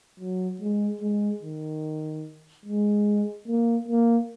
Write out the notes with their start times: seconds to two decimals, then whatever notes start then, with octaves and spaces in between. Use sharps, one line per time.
0.19 F#3
0.61 G#3
1.01 G#3
1.43 D#3
2.65 G#3
3.48 A#3
3.88 A#3